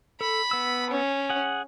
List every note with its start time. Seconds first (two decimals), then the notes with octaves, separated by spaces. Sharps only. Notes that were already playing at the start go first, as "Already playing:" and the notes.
0.21 A4 B5
0.51 B3 E6
0.90 C#4
1.29 G#4 F#5